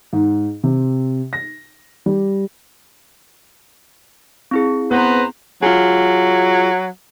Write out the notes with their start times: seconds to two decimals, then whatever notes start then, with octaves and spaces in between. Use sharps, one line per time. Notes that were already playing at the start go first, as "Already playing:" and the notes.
0.13 G#2
0.63 C3
1.33 A#6
2.06 G3
4.51 C4 E4 G#4
4.91 B3 B4 C5 A#5
5.63 F#3 F4 G#4